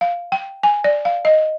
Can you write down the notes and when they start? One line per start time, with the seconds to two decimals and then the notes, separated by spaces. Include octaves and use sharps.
0.01 F5
0.32 G5
0.63 G#5
0.84 D5
1.05 F5
1.25 D#5